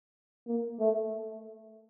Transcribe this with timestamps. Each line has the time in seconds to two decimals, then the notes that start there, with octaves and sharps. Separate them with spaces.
0.47 A#3
0.79 A3